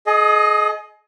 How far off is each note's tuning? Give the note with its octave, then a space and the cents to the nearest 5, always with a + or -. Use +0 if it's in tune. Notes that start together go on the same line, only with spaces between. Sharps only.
G#4 +35 D#5 +0